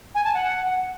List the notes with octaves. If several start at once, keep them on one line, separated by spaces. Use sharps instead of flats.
G#5
A5
F#5